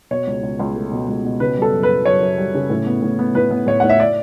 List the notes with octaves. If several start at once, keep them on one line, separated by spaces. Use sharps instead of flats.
B2 C#5
C#2
C#2
C#2
A3
B2
C#2
B2
C#3 B4
G3
A4
F#2
B4
B3
F#2 C#5
F#2
G3
C#3
A2
B3
A2
B3
A2 B4
B3
A2 C#5
A2 F#5
E5
D5